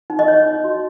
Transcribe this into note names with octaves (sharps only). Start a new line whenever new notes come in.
D#4
D#5
D#4 C#5
D#4
F#4